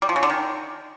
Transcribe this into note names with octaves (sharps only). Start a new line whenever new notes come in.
G3
F3
C#3
D3
D#3